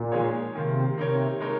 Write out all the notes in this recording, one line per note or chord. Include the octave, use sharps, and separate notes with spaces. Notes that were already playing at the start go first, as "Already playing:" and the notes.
Already playing: A#2
F3 G#3 D#4 G#4 C#5
C3 D#3 A#3 F4
C3 A#3 D#4 A#4 C#5
G#3 D#4 A#4 C#5